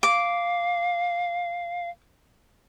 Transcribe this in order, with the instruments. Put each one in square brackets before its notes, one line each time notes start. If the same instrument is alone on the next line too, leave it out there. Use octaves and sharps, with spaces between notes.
[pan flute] F5 [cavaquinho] D6